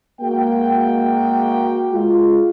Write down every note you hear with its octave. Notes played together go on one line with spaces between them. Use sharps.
G#3 A#3 F#4 G5
G#3 F4